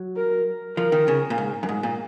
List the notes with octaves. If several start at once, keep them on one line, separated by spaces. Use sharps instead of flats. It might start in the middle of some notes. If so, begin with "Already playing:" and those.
Already playing: F#3
A#4
F3 A#4
D#3
C#3
A#2
G#2
F#2
G#2
A#2